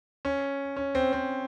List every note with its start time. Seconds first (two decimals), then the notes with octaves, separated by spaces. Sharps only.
0.25 C#4
0.76 C#4
0.95 C4
1.13 C4